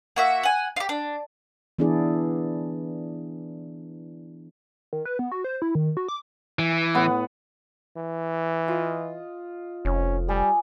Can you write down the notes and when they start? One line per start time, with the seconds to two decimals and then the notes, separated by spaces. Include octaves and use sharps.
0.16 A#3 F#4 E5
0.43 F#5 G#5
0.76 F4 G4
0.89 D4
1.79 E3 B3 D4 E4 G#4 D5
4.93 D#3
5.05 B4
5.19 B3
5.32 F#4
5.44 C5
5.62 E4
5.75 D#3
5.97 F#4
6.08 D6
6.59 E3
6.94 A2 B3 F#5
7.97 E3
8.68 F4 D#5
9.85 F1 C#4
10.28 G3 D5 G#5 D#6